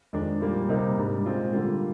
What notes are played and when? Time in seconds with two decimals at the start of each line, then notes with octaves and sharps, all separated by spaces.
0.13 F2 D#3 G#3 D4
0.40 A#2 G3 A#3
0.69 C3 G3 A#3 D#4
0.98 G#2 G3 D4
1.26 A#2 G#3 C4 F4
1.53 D3 G3 A#3 F4